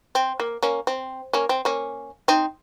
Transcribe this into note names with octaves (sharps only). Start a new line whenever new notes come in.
C4
A#3
A#3 C#4
C4
A#3 C#4
C4
A#3 C#4
C4 D#4